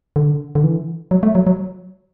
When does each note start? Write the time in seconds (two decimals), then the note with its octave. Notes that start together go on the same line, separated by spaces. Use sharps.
0.16 D3
0.55 D3
0.64 E3
1.11 F#3
1.23 A3
1.35 F#3
1.47 F#3